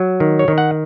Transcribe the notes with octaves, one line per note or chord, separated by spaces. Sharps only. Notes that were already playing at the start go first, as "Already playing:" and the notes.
Already playing: F#3
D#3
C#5
D#3
F#5